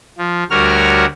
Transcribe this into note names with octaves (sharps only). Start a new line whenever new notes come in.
F3
D2 G3 F#4 A#4 C#5 F6